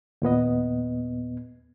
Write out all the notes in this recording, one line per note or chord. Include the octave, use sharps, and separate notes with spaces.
D#2 A#2 B3 D#5